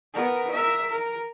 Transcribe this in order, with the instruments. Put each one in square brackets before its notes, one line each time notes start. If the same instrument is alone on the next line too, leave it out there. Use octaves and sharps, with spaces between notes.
[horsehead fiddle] B3 A#4
A#4 E5
A#4